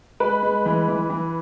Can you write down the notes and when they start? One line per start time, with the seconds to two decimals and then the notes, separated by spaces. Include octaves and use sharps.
0.20 G#3 B4
0.43 G#3
0.66 E3
0.88 E3
1.10 E3